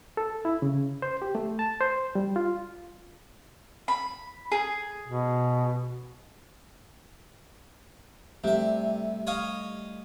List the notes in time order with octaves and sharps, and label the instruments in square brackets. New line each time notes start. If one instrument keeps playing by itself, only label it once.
[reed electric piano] A4
E4
C#3
C5
G4
A3
A5
C5
G3
F4
[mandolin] B5
G#4
[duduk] B2
[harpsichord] C3 E5 [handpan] G3 A3 G4
[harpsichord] C#5 D#5 F5